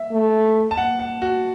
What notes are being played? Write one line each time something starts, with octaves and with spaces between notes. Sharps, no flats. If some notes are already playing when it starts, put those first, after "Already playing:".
Already playing: E5
A3
A5
F#5
F#5
F#4